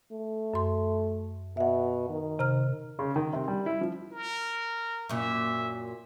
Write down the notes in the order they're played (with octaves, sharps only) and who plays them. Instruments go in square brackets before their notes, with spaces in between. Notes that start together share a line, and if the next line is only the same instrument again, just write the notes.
[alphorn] A3
[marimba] F#2 C6
[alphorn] B2 [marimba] E5 F#5
[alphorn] D#3
[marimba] C3 A#5 F6
[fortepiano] C#3
D#3
C3
G3
E4
F3
[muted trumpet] A#4
[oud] F#2 A#2 [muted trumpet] E5